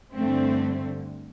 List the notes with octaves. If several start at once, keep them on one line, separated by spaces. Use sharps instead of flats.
G2 D3 A3 C4